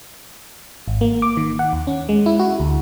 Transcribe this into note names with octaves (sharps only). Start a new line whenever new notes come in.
G#1
A#3
D6
D#3
F#5
D#2
C#4
G#3
E4
F#4
D2